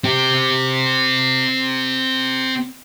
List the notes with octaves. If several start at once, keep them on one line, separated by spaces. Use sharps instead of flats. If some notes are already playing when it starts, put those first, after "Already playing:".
C4 G4